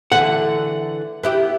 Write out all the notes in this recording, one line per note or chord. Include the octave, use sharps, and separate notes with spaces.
D3 E3 A3 F#5
B3 E4 G4